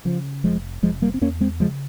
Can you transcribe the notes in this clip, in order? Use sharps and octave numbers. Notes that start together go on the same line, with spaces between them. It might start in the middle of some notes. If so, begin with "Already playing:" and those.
C#3 F3
F1 F3 G#3
F1 F3 G#3
G3 A#3
C4
E2 A#3 C#4
G#3 C4
C#3 F3 G#3